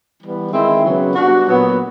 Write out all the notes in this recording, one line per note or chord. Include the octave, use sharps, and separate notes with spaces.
E3 G3 B3
D#3 G#3 C4 E4
C#3 F#3 B3
G3 B3 D4 F#4
A#2 F#3 B3